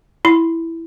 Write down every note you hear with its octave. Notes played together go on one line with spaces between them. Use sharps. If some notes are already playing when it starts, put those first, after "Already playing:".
E4 B5